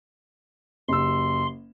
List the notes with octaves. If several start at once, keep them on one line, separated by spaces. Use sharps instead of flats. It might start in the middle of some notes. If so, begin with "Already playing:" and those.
F#1 G4 C6 E6